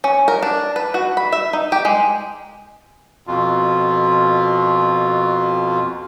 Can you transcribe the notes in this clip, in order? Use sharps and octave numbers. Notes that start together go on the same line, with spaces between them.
C#4
A#4
D4
B4
F#4
B5
E5
D#4
G4
G#3
F2 B2 F4